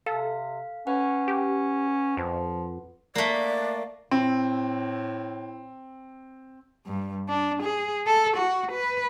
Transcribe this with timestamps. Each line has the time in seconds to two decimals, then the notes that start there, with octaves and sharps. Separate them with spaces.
0.06 C3 A4 F5
0.87 C#4 B4 F#5
1.28 G4
2.17 F2 F3
3.15 A3 A#3 D5
4.11 A2 C4
6.86 G2
7.29 D4
7.64 G#4
8.07 A4
8.37 F#4
8.73 B4